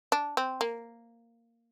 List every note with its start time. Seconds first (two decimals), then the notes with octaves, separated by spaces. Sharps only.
0.12 D4
0.37 C4
0.61 A#3